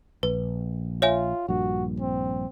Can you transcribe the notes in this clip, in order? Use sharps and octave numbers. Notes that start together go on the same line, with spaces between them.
A#1 B4
F4 C#5 E5 G#5
A#1 G2 A#2 F#4
C4